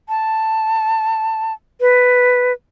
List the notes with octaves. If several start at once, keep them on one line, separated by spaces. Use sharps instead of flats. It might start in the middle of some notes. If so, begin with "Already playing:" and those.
A5
B4